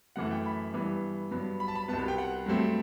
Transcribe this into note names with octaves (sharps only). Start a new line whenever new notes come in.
F#2 E3 A3 F#5
G5
B5
G2 E3 G3 B3
G2 F#3 B3
B5
A5
B5
C2 B2 G3 B3 A5
B5
G5
F#5
G2 F#3 A3 C4